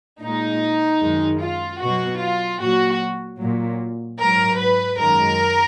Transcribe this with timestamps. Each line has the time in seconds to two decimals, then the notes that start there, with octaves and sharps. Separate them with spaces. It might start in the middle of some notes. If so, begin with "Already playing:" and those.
0.22 A#2 G#3 D#4
1.01 F#2 D#3 G#3
1.41 F4
1.81 B2 F#3 F#4
2.20 F4
2.61 A#2 F#3 F#4
3.40 A#2 F#3
4.20 G#2 F#3 A#4
4.59 B4
4.99 F#2 D#3 G#3 A#4